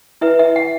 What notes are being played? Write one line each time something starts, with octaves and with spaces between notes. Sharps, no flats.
E4 B4 E5
E5
F#5